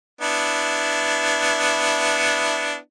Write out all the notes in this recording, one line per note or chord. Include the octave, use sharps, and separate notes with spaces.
B3 D4 E4